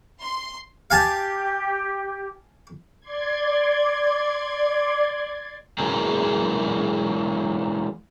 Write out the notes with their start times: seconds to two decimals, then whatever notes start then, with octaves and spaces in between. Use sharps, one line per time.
0.21 C6
0.90 G4 F5 G#5 A5
3.00 D5 C6 G#6
5.78 E3 F#3 G#3 F#4 G#4 A#4